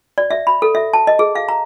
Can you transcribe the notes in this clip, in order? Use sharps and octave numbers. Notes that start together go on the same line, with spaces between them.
D5
E5
B5
A4
E5
A5
D#5
G#4
F5
A#5